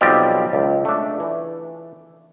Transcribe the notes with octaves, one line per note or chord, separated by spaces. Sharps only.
B1 F3 G3 C4 G4 D5
C#2
A3 D4
E3